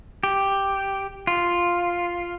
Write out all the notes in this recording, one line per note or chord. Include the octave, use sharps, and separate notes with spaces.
G4
F4